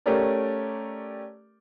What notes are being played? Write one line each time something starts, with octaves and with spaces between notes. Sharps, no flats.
A3 C#4 G4 A#4 D5